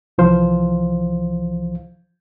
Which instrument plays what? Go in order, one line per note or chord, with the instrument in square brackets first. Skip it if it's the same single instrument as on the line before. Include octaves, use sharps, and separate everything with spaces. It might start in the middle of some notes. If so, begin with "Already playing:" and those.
[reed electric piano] C2 E3 F3 C5 F5